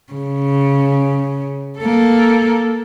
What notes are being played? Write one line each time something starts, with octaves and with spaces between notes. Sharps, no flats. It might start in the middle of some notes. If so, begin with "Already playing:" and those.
C#3
A#3 A4